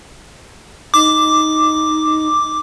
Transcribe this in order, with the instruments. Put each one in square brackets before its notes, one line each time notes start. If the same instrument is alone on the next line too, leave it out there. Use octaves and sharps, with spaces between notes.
[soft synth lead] D#4 [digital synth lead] D6